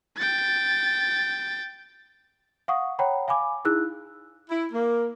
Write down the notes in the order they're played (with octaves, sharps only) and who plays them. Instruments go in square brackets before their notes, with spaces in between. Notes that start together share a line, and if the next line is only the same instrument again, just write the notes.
[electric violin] G5 A6
[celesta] F5 F#5 C#6 D#6
C#5 F#5 G5 A#5 B5
F5 G#5 B5 D6
D#4 E4 G#4 E6 F#6
[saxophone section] E4
A#3